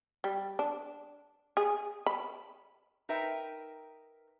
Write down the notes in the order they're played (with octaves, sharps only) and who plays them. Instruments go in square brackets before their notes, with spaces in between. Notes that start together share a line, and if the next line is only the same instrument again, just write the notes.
[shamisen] G3
D4
G#4
B5
[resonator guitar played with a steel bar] D#4 A#4 B4 E5 G5